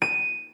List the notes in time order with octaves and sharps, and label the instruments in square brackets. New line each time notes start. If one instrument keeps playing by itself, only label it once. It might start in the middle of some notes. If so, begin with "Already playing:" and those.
[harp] D#7